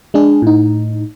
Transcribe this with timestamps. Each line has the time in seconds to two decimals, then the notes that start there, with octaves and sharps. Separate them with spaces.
0.14 G#3 D4 G#4
0.42 A2 D#4